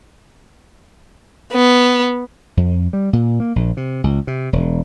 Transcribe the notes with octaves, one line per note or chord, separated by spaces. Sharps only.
B3
F2
G3
A#2
A#3
A#1
C3
C#2
C3
E1